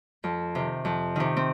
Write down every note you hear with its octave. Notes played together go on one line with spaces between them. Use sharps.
F2
C3 D#3
F2
C3 D#3
C4